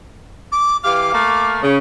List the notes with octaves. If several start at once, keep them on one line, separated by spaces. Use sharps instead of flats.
D6
E3 G4 F5 D6
A3 A#3 F5
C#3